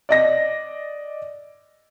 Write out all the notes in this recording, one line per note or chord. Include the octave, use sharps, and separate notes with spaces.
D5 D#5 A#6